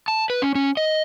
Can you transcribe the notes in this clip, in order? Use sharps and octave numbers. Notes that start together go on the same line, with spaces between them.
A5
B4
C#4
C#4
D#5